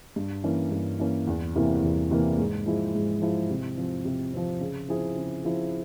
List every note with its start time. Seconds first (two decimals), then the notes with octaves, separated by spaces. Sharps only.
0.16 G2
0.44 E3 A#3 C#4
0.71 G2
0.99 E3 A#3 C#4
1.27 E2
1.56 C3 E3 A#3 E4
1.83 E2
2.11 C3 E3 A#3 E4
2.38 G#2
2.66 F3 G#3 E4
2.95 G#2
3.22 F3 G#3 E4
3.50 C3
3.78 F3 C4
4.05 C3
4.33 F3 C4
4.61 C#3
4.88 F3 C4 E4 G#4
5.16 C#3
5.44 F3 C4 E4 G#4